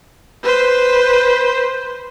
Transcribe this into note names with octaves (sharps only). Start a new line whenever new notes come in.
B4 C5